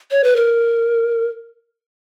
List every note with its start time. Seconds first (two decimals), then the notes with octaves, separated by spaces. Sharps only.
0.11 C#5
0.24 B4
0.36 A#4